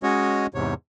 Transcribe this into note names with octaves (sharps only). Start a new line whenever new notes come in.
G#3 C#4 F#4 C#5 D#5
E2 G#2 C3 C#5